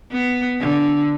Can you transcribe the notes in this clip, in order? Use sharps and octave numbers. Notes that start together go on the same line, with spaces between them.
B3
D3